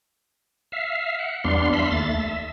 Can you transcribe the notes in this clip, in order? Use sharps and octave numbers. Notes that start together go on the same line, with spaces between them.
E5 F5
F#5
E2 G3 B3 D4 F5 C6
E5 F5 B5 C6
D#2 A3 A6
E5